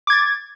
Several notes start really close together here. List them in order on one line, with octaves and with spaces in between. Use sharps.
D6 G#6 A6